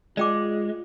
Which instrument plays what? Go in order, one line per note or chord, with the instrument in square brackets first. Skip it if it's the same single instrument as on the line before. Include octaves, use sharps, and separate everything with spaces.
[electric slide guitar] G#3 [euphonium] F4 [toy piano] D5 G5 D6